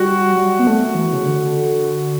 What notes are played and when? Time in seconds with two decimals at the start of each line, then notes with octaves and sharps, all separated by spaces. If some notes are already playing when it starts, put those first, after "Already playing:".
Already playing: G3 F#4
0.33 F#3
0.38 G3
0.59 B3
0.67 A3
0.95 E3
1.13 C#3
1.24 D3